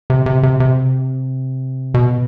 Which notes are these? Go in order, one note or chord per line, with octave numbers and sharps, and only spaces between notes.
C3
C3
C3
C3
B2